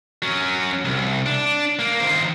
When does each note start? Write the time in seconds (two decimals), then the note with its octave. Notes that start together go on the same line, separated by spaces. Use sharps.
0.22 F#3 C#4
0.85 C2
1.26 D4
1.79 A#3
2.00 D#3 C5